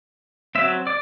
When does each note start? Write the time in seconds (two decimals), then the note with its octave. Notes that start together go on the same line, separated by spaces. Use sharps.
0.55 F#3 C4 E5
0.87 D5